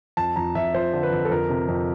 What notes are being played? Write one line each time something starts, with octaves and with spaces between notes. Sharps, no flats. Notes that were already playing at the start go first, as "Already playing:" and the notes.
F2 A5
F2 A#5
F2 E5
F3 C5
D3
B4
F2
A4
F2 A#4
C3
F2